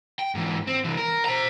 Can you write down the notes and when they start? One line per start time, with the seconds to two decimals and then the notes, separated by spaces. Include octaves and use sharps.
0.19 G5
0.35 G#2 E3
0.67 C4
0.84 C3 E3
0.97 A#4
1.25 C5 A#5